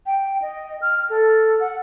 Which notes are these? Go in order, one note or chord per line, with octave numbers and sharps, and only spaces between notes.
G5
D#5
F6
A4
F#5